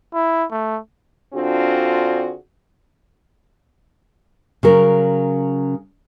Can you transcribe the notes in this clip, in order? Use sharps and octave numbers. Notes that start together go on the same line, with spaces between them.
E4
A3
D3 C4 D4 F4 F#4 G#4
C#3 F#3 A#4